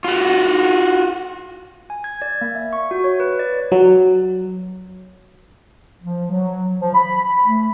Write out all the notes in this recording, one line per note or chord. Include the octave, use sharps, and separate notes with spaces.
F4 F#4
G#5
G#6
D5
A#3
E5
C#6
F#4
C#5
B4
D5
F#3
F3
F#3
F3
B5
A3